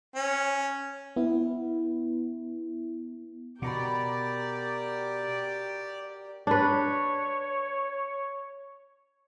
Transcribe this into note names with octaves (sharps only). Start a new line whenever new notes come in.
C#4
B3 E4
B2 F#4 G4 A#4 D5 G5 A#5 B5
D4 B4 C#5